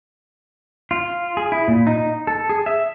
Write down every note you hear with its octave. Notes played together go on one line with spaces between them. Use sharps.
F4
G#4
E4
A#2
D#4
A4
G#4
E5